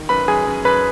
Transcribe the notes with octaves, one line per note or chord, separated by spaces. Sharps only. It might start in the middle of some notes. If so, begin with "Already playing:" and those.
Already playing: D#3
F#2 B4 B5
F#2 G#4 G#5
F#2
F#2 B4 B5